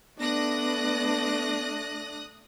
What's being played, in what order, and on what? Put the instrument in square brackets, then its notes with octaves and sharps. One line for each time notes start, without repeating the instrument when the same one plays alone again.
[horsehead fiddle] A3 D4 [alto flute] B3 [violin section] D#6 F#6 A#6